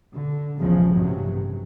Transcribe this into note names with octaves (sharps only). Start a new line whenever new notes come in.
D3
A#1 E2 C#3 F3 G#3
A1 G2 C3 F#3